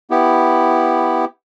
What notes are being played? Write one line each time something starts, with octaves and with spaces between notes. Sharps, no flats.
B3 E4 G4